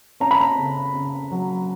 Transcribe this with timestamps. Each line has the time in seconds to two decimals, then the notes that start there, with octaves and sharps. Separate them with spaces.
0.20 C#4 A#5
0.31 B5
0.41 A#5
0.58 C#3
0.94 C#3
1.32 F#3